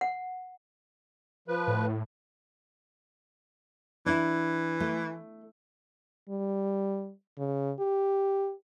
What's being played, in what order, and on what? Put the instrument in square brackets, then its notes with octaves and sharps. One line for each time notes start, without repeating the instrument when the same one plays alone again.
[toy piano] F#5
[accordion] F3 B4
[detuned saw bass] A2
[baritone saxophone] E3 [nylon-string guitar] D4 E4
[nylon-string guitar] A3
[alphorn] G3
C#3
G4